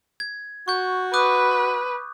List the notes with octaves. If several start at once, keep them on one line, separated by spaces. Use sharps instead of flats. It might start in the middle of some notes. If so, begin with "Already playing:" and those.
G#6
F#4 C#6 G6
B4 D6 D#6 F#6